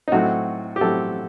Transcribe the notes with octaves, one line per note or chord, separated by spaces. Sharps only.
D#4
A2 F#3 A3 C4 F#4
G4
A2 F#3 A3 C4 A4